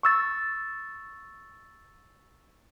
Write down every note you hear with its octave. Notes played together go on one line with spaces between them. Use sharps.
C#6 E6 A6